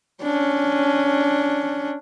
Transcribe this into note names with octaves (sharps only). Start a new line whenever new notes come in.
C#4 D4